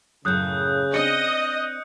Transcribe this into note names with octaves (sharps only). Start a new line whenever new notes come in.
F#2 A2 C#3 D#6 F#6 G6
C4 D4 D#5 D#6 C#7